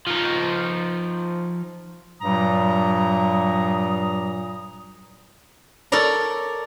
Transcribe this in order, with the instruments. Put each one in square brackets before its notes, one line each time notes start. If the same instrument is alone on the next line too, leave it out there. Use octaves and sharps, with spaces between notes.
[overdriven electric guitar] F3 D#4
[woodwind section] G2 A#2 F#3 G3 A#5 D#6
[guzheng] A4 A#4 C#5 D5 A#5